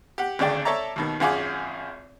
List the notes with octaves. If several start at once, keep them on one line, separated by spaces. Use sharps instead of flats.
G4 F#5
G#1 D2 C#3 D4 D5 G5
A4 C#5 D5 E5 A5 A#5
D#2 B2 D#3
G#1 F#2 F4 G#4 F#5 D6